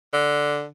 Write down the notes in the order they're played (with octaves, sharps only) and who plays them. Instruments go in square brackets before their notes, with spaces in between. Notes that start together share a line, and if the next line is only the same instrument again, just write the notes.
[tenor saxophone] D3